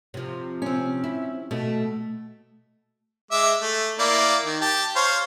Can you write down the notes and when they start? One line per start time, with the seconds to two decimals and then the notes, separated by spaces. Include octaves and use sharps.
0.14 C3 F3
0.62 C4 C#4
1.04 E4
1.51 B2 A3
3.31 G#3 E5 D6
3.62 A3
3.99 A#3 E4 D5
4.45 D#3
4.61 G4 A5
4.96 C5 C#5 F5